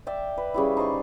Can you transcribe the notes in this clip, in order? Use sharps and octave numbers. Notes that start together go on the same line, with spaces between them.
D5 E5 G5
B4
C#3 G3 E4
D#4 C5 D5 C#6